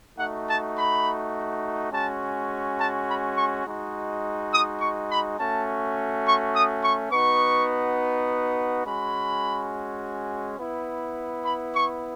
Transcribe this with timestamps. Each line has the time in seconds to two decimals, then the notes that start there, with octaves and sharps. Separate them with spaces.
0.18 A3 D#4 F#4 F#5
0.48 A5
0.77 B5
1.92 G#3 C#4 F#4 A5
2.78 A5
3.07 B5
3.36 C#6
3.65 G#3 D#4 F#4
4.52 D#6
4.81 C#6
5.10 B5
5.38 A3 C#4 F#4 A5
6.25 C#6
6.54 D#6
6.83 C#6
7.12 B3 D#4 F#4 C#6
8.85 G#3 C#4 F#4 B5
10.59 B3 E4
11.45 B5
11.74 C#6